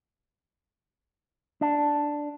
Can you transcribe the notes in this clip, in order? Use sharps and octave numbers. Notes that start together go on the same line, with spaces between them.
D4